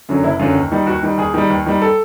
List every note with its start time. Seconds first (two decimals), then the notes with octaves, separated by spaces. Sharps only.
0.09 F#2 D3 F#3
0.24 F#1 E4
0.39 F#2 D3 F#3 F4
0.55 D#2
0.72 D#3 G3
0.87 D#2 F#4
1.03 D#3 G3
1.18 D#2 G#4
1.34 D#3 G3
1.50 D#2
1.66 D#3 G3
1.82 A4